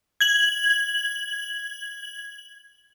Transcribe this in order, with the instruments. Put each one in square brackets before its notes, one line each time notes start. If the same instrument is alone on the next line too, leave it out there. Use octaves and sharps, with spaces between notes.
[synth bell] G#6 F#7